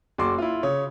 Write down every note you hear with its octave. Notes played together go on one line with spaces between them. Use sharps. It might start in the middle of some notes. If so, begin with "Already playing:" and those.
F#1 F#4 C6 D6
E4 F4
C#3 C#5